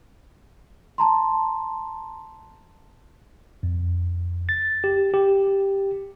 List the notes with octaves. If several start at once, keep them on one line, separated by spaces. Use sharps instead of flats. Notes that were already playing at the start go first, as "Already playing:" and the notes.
A5 A#5 C6
F2
A6
G4
G4